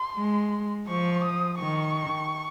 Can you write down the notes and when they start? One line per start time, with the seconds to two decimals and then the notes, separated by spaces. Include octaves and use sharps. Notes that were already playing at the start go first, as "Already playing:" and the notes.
Already playing: C6
0.17 G#3
0.88 F3 C#6
1.24 D#6
1.59 D#3 C#6